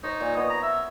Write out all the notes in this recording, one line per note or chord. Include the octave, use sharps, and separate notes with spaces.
D#4 C5 C#5
A#2
B3 C#5 D#5
A#5
E5